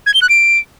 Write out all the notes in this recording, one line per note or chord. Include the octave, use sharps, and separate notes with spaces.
G#6
G7
F#6
D7